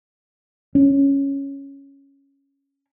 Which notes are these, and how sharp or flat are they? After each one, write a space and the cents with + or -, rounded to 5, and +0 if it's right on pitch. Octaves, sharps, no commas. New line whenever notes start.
C#4 +0